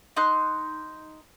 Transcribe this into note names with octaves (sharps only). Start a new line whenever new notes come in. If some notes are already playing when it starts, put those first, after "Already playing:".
D#4 C6 F#6